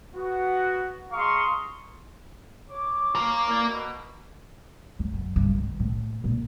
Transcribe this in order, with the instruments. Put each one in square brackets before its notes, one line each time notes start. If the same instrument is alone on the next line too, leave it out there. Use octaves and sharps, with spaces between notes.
[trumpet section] B3 F#4
G#3 F5 A#5 C6 C#6 D#6
[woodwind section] C#5 D6
[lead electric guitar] A#3 A#4
[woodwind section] E3 E4 D5
B2
[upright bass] F#2
F#2
G2
D#3
A2
A#2